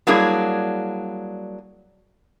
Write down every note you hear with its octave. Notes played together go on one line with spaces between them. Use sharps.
F#3 G3 A#3 D4 E4 G#4